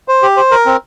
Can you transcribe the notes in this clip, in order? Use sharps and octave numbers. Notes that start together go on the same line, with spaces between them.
C5
G4
C5
A#4
C4